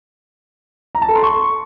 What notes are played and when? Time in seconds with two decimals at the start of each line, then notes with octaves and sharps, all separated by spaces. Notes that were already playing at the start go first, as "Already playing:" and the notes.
0.95 A#5
1.02 A5
1.09 A4
1.16 C6
1.23 C#6